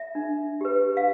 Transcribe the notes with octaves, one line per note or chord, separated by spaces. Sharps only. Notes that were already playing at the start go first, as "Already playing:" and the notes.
Already playing: E5
D4
G4 B4
F5